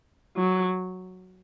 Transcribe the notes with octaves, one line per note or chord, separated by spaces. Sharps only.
F#3